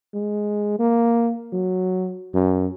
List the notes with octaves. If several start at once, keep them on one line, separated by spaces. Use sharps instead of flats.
G#3
A#3
F#3
F#2